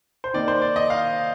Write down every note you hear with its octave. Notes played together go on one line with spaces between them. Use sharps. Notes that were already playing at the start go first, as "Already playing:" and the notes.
C5
D#3 A#3 D#4 D5
C5
D5
D#5
F5